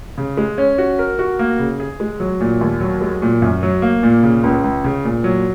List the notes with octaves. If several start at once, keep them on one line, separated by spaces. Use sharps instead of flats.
C#3
G#3
C#4
F#4
A#4
F#4
A#3
C#3
G#4
G#3
F#3
A#2
D#2
F#3
G#3
A#2
F#2
F#3
A#3
A#2
C#3
C#2
C#2
C#3
A#2
F#3